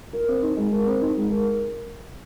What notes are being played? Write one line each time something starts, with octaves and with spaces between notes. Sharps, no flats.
A#4
C4
D#4
G#3
A#4
C4
D#4
G#3
A#4